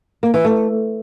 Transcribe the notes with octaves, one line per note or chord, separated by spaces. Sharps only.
A#3
E3
A3